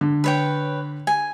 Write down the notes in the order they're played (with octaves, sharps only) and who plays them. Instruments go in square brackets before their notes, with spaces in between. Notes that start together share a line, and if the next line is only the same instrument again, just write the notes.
[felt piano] D3
[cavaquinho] B4 C#5 G5
G#5